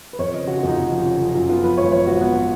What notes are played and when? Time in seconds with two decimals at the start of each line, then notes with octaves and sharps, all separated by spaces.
0.13 B4
0.19 F2 C#5
0.34 C#3 D#5
0.47 C#3 F#4
0.58 F4
0.63 F2 D#4
0.76 F1
0.91 F3
1.05 C#3
1.20 F3
1.34 F#2 F4
1.49 B3 F4
1.64 F3 B4
1.78 G#1 C#5
1.92 F3 C#5
2.07 G#1 F#4
2.21 B3
2.35 B3